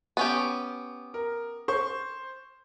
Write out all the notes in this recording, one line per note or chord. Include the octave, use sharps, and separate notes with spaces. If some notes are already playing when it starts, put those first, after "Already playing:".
B3 C#4 G4
A#4
C5 C6 C#6